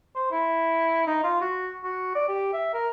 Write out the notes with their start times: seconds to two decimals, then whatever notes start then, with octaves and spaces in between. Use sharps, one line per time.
0.15 C5
0.31 E4
1.07 D#4
1.24 F4
1.41 F#4
1.84 F#4
2.15 D5
2.28 G4
2.53 E5
2.73 A#4